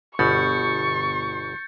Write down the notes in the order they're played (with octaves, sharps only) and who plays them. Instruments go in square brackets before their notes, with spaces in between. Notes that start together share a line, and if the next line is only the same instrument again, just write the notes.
[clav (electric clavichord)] G1 B2 [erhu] C#6 [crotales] G6 A6 C#7